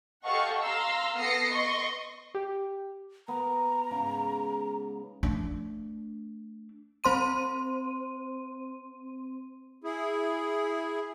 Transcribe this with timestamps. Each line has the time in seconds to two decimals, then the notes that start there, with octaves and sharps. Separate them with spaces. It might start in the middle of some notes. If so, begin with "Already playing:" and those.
0.24 G4 A4 D#5 F5 F#5 C#6
0.61 F5 A#5 C6 E6
1.19 B3 A4 D#6 A#6 C7 C#7
1.52 D#5 C6 C#6
2.35 G4
3.28 B3 A#5
3.91 G#2 C#3
5.23 A3 D4
7.04 C4 C5 C6 D#7
9.84 E4 G#4